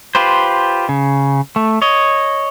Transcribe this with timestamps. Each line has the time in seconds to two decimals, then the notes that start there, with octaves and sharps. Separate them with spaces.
0.15 F4 G4 B4 C5
0.89 C#3
1.56 A3
1.82 C#5 D#5